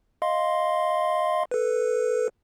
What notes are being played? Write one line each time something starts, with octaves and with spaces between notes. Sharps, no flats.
D#5 F5 C6
A4 B4